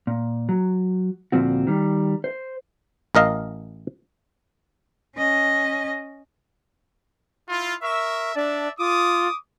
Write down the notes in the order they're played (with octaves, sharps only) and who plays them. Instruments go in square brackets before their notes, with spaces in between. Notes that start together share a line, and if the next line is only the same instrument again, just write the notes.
[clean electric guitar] A#2
F#3
D2 A#2 F3 C4 F#4
D#3 G3
C5
[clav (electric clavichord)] A1 A#4 D#5 F5
[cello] C#4 D#5
[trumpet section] E4 F4
[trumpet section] A#4 E5 [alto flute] C#6
[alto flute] D4 [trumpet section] D5 E5 A5
[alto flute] F4 [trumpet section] D6 D#6